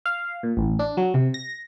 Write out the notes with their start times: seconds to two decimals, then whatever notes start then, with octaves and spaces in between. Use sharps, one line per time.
0.06 F5
0.43 A#2
0.57 A1
0.79 D4
0.97 F#3
1.14 C3
1.34 A#6